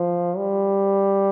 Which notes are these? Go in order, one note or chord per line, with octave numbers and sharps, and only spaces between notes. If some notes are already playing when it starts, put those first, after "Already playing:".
Already playing: F3
G3